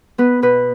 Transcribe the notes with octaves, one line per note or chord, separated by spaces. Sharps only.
B3 B4
B2 B4